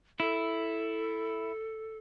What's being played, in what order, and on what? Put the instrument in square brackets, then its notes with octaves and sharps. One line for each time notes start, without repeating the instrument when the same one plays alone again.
[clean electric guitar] E4 [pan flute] A4